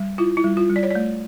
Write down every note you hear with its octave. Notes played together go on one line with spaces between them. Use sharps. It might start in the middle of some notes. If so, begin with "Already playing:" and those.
Already playing: G3
E4 F4
E4
G3
F4
G3
D5
C#5
A3 D5